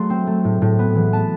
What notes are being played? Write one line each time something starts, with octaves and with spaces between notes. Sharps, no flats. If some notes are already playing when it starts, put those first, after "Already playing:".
Already playing: F#3 A3 C6
C4
A3
A2
A2
B3
E3
B3 A5